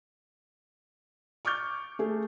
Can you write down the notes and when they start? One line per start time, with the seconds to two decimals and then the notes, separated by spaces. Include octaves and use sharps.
1.45 C#6 D6 F6 G6
1.99 A3 G#4 A4